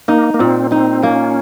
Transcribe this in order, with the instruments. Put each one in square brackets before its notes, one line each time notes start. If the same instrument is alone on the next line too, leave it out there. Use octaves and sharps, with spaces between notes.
[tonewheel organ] A#3 [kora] D#4
[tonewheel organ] A#3
[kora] A#2 [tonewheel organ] C4
[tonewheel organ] C4 [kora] D#4
[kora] A#3 [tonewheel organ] C#4